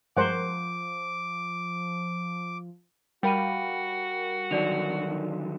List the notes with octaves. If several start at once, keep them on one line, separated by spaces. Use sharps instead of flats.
G2 F3 G#3 A#4 C5 F#5 D6
G3 F#4 A#4 F5 G5 B5 D#7
D3 D#3 F#3 D#4 D5 F7